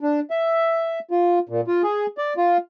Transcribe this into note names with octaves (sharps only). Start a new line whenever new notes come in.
D4
E5
F4
A#2
F4
G#4
D5
F4